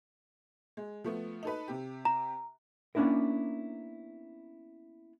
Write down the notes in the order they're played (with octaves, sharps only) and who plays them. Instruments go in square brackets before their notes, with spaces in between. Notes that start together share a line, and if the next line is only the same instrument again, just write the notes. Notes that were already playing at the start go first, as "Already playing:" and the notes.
[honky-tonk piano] G#3
F3 A3 B3
D#4 A4 B4
C3 G4
[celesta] A#5
[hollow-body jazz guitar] A#3 B3 C#4 D4 E4 A#4